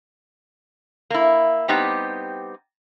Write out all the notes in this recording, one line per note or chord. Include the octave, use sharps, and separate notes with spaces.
A#3 E4
G3 B3 C4 D#4 G4